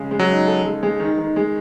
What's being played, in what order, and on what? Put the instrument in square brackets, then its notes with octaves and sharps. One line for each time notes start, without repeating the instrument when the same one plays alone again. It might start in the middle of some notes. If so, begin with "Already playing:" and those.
Already playing: [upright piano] C#3 G#3
G#3
[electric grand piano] F#3
[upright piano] D#4
A4
G#3
G#3
D#3
D#3
G#3